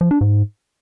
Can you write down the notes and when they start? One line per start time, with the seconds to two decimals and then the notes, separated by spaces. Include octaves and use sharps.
0.01 F3
0.11 D4
0.21 G#2